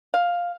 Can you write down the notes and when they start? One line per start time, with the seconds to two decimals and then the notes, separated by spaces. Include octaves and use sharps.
0.14 F5